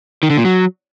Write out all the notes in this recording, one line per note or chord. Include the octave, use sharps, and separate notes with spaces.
D#3
D3
A#2
F#3